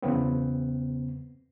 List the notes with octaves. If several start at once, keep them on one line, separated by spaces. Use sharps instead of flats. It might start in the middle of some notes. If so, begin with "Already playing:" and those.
E2 C#3 B3 C4